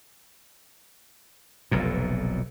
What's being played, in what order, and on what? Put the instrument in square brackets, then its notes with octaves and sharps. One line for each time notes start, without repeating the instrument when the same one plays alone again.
[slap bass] F1 B1 F2 A#2